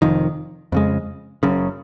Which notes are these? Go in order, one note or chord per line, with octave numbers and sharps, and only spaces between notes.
F1 F2 D#3
F2 C#3 G#3
F#1 F#2 C#3